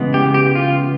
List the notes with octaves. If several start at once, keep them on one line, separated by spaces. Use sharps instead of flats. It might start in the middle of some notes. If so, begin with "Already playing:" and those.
Already playing: C#3 E3 G#3 B3
G4
G4
F4